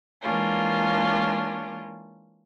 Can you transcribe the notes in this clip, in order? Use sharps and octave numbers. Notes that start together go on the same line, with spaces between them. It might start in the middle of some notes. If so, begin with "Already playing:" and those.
E3 G#3 A#3 C#4 D4 F4